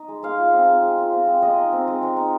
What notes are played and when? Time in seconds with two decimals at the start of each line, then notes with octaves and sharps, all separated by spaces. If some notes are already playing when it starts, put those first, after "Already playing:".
Already playing: D#4
0.08 G#3
0.23 G#3 F5
0.38 F4
0.52 C4
0.67 G#3
0.83 G#3
0.98 F4
1.12 C4
1.27 G#3
1.42 G#3 D#5
1.58 D#4
1.72 C4
1.88 G#3
2.03 G#3
2.17 D#4